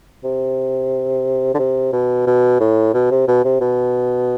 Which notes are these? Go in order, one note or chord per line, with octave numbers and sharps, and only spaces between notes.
C3
D3
C3
B2
B2
A2
B2
C3
B2
C3
B2